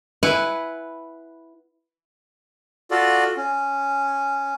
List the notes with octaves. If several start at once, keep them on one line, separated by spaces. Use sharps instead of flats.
E4 B4 F#5 G#5
F4 F#4 A4 D5
C#4